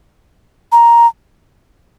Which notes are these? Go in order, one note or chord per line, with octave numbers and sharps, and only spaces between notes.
A#5